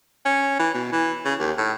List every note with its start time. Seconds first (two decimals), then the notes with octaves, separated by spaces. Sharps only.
0.26 C#4
0.59 E3
0.74 B2
0.92 E3
1.25 C#3
1.39 D#2
1.58 A2